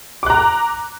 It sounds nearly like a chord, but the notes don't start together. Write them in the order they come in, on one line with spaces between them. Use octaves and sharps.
D6 F#6 A#5